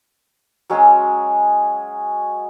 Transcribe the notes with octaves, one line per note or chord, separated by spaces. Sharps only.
F#3 G#3 C#4 C6